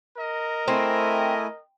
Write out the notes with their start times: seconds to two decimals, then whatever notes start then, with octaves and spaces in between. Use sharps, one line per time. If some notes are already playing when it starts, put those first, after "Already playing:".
0.17 A#4 D#5
0.68 A3 C4 E4 G#5